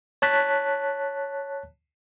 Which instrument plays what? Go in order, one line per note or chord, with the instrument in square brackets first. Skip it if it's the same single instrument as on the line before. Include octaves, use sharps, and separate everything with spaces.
[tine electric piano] C#5 A5 F#6 B6